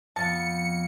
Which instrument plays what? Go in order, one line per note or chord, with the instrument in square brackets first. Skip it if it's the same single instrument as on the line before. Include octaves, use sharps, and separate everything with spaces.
[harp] F2 B3 [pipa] A5 [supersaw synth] C#7